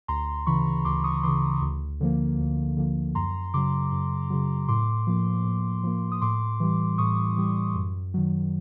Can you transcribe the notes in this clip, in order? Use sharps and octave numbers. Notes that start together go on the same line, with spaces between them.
D2 A#5 C6
C#3 E3 B5 C#6
D2 C6 D6
C#6 D#6
C#3 E3 C6 D6
D2
D3 F3 A#3
D2
D3 F3 A#3
F#2 A#5 C6
C#3 F#3 C6 D6
F#2
C#3 F#3
A2 C6 D6
F3 A#3
A2
F3 A#3
D#6
A2 C6 D6
E3 G3
A2 C#6 D#6
E3 G3
F#2
D#3 F#3